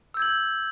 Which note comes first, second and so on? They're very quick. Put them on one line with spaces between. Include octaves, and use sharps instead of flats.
E6 G6 G#6 F#7